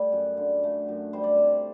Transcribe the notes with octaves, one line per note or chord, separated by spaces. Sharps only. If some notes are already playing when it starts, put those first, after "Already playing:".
Already playing: G3 A3 B4
F#2
D3
A3
F#2
G3 C5
D5
C3 C5